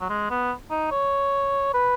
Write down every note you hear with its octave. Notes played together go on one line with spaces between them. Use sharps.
F#3
G#3
B3
D#4
C#5
B4